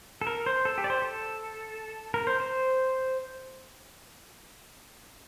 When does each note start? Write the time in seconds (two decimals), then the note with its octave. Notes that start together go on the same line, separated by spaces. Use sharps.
0.21 A4
0.27 A#4
0.46 C5
0.65 A4
0.78 G4
0.84 D5
0.90 C5
1.02 A4
2.14 A#4
2.27 C5
2.40 C5